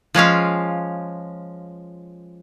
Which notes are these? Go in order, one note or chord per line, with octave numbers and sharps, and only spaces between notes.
F3 G#3 C#4 F5